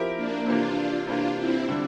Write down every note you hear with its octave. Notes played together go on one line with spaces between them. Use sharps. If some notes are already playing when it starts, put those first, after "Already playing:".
Already playing: F3 C4 E4 G4 A#4
A#3 D4
C3 E3 A#3 D4 F4
C3 E3 A#3 D4 F4
C4 E4
D3 G3 D4